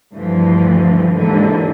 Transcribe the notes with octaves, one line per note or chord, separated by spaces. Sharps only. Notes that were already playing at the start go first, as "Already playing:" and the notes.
D2 G2 E3 F3
D#2 G#2 D3 E3